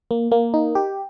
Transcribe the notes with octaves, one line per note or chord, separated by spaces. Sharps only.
A#3
A#3
D#4
G4